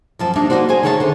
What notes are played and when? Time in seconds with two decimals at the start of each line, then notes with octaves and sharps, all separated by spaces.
0.19 F#2 F3 A5
0.36 G3 A#3 D4 D#4
0.50 A#3 C4 D#4 F#4 C5 D5
0.68 D#4 G#4 C5 G#5
0.83 D#3 A3 G#4 C#5 E5 A5
1.00 D3 C5